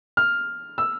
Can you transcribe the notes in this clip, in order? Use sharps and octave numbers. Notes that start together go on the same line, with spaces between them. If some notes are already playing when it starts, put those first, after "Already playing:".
F6
E6